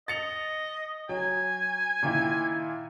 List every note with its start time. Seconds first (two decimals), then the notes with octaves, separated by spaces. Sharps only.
0.08 D#5 A6 C#7 F7
1.09 F#3 G#5
2.03 A#2 D#3 E4